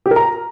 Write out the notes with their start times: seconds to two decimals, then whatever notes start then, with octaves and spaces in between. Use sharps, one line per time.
0.06 G4
0.11 A#4
0.16 A#5